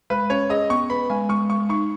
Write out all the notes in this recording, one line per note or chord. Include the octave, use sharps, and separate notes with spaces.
G#3 B4
C#4 C#5
G#4 D#5
B3 C#6
B4 B5
G#3 G#5
G#3 C#6
G#3 C#6
D#4 C#6